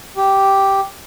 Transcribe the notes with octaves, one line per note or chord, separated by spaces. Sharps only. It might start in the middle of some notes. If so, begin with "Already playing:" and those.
G4